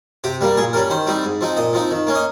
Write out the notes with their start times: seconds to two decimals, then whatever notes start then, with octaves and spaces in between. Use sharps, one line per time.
0.24 C3 G4
0.41 G3 A#3
0.57 A#2 G#4
0.73 G3 C#4 A#4
0.90 D#3 C5
1.07 G3 C4 D#4
1.23 G#2
1.41 F3 C4 D#4
1.57 A#2 D#5
1.73 F3 C4 D#4
1.91 D#3
2.07 A#3 C#4
2.15 D#5